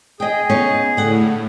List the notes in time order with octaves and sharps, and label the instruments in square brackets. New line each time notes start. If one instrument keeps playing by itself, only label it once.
[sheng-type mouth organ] G#4 [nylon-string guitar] D#5 G5
[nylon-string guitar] B3 C#4 D#4
[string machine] A2 [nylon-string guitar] D3 F#5